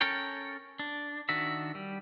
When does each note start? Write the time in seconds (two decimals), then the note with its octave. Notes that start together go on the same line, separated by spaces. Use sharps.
0.01 C#4 A4 A#4 C#5 G5
0.79 D4
1.29 D#3 D4 F#4 E5
1.75 G3